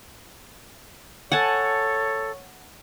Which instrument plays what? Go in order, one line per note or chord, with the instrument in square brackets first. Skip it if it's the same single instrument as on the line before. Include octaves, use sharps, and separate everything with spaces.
[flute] A4 [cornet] C#5 [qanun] F#5 G#5 A5